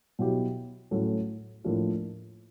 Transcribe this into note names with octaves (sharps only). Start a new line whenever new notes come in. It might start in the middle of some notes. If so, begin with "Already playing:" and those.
B2 F#3 B3 E4 G4
A2 F#3 A3 C#4
A2 F3 A#3 D4 F4